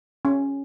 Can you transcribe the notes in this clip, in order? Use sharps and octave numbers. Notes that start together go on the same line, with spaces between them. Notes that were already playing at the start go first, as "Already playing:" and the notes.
C#4